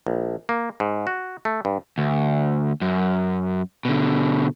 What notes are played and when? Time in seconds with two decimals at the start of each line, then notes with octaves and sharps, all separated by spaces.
0.07 A#1
0.49 A#3
0.80 G#2
1.07 F#4
1.45 A3
1.65 G2
1.98 D2
2.81 F#2
3.85 B2 D3